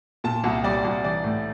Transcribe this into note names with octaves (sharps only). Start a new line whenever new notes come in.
A#2 A5
C2
G3 D5
C2
E3 D5
A2